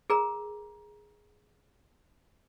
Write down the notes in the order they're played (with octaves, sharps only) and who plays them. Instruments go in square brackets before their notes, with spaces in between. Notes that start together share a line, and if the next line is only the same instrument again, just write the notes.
[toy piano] G#4 A#4 A#5